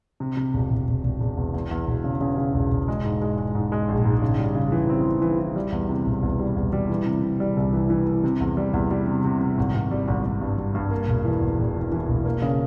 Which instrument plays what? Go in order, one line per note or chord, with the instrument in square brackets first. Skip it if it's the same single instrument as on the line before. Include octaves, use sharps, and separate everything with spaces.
[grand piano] C3
C3
E1
E1
E1
E1
E1
E2
E2
E2
E1
C#3
C#3
C#3
E1
E1
G#3
G#2
G#3
G#3
G#2
G#3
A#1
G#2
C#3
G3
C#3
E3
C4
E3
E3
E3
G3
E2
C3
E1
E2
G3
E2
G3
E3
C3
C3
G3
C2
E3
E3
E3
C3
E2
G3
E2
G3
C3
C3
C3
G#1
G#1
G3
G#1
G#1
G2
G3
G2
A#3
E1
E3
E2
E1
E3
E3
E1
A#3
C#3